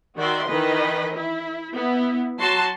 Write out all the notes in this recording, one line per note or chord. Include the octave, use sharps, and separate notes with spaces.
D#3 F#4 D5 E5 C6
D#3 E3 B4 D#5
E4
B3 E4
F#3 F#4 A5 C6